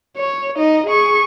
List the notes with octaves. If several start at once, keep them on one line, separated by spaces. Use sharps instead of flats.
C#5
D#4 D#5
G#4 C#6